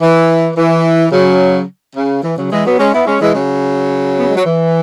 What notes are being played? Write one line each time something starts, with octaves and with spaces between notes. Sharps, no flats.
E3
E3
C#3 F#3
C#3
E3
C#3 F#3
E3 G#3
F#3 B3
G#3 C#4
B3 E4
G#3 C#4
E3 G#3
C#3 F#3
B3
G#3
F#3
E3